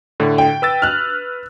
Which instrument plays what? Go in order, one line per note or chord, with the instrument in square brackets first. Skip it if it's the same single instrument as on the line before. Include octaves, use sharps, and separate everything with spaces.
[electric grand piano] A2 D3
[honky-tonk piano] G5
[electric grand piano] B4 E6 A6
[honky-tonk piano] F6 F#6